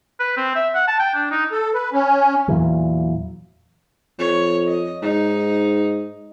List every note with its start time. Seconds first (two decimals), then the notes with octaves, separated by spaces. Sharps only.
0.20 B4
0.37 C4
0.55 E5
0.75 F#5
0.87 A5
0.99 G5
1.14 D4
1.31 D#4
1.52 A4
1.74 B4
1.93 C#4
2.48 E2 A#2 E3 F#3
4.19 F2 C#5
4.67 D#5
5.02 G#2 D#4